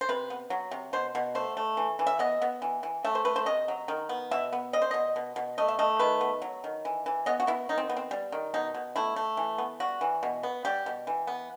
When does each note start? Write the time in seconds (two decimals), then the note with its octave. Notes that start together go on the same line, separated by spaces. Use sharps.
0.01 C5
0.09 C3 B4
0.30 B3
0.50 F#3
0.71 C3
0.93 B2 C5
1.15 B2
1.35 A3 C5
1.57 A3
1.77 E3
1.99 E3
2.07 E5
2.19 B3 D#5
2.42 B3
2.62 E3
2.83 E3
3.04 A3 E5
3.15 C5
3.25 A3 B4
3.36 C5
3.46 C3 D#5
3.68 F#3
3.88 D#3
4.09 B3
4.31 B2 E5
4.53 B3
4.73 G3 D#5
4.82 C5
4.91 B2 D#5
5.16 B2
5.36 B2
5.58 A3 D#5
5.68 E5
5.79 A3 D#5
5.99 D#3 B4
6.21 B3
6.42 F#3
6.64 D#3
6.85 E3
7.06 E3
7.26 B3 D#5
7.40 F#4
7.47 B3 E4
7.69 D#3 D#4
7.78 C4
7.89 B3
7.97 C4
8.11 G3
8.32 D#3
8.54 B2 D#4
8.75 B2
8.96 A3 E4
9.16 A3
9.37 E3
9.58 B3
9.80 G3 F#4
10.01 E3
10.23 B2
10.43 B3
10.65 G3 G4
10.86 B2
11.07 E3
11.27 B3